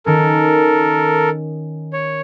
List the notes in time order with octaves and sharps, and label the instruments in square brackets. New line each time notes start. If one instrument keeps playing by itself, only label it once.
[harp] D#3 C#4 [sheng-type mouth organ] A4 A#4
[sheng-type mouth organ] C#5